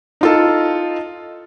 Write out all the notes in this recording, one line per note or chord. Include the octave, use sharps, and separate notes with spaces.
D#4 F4 A4